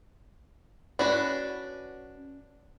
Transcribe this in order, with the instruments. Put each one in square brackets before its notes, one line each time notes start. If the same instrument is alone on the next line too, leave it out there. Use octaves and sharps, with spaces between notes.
[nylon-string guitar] C#4 [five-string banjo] D4 F#4 B4